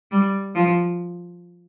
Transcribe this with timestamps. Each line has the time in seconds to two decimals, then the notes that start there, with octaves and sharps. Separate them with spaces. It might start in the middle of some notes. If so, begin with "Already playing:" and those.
0.12 G3
0.55 F3